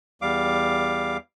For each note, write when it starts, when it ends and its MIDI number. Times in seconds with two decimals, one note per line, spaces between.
0.22 1.17 40
0.22 1.17 55
0.22 1.17 77
0.22 1.17 86